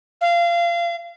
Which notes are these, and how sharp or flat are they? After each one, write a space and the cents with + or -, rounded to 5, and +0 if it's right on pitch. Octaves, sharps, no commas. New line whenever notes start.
F5 -25